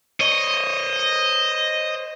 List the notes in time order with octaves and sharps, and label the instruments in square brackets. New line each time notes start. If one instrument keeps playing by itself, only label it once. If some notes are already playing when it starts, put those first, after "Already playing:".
[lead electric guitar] C5 C#5 [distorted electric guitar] D#5